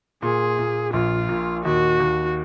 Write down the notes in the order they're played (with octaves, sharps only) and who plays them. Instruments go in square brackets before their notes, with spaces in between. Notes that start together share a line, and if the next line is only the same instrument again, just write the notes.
[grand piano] A#2 [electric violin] G#4
[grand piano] A#2
[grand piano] A#1 [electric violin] F4
[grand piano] A#2
[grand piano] D#2 [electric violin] F#4
[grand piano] D#2